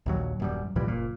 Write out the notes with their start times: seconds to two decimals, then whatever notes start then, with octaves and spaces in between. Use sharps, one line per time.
0.06 A#1 D#2 F#3
0.40 D#1 F#2 G3
0.76 C#2 A#2 E3 G3
0.88 F#1 A#2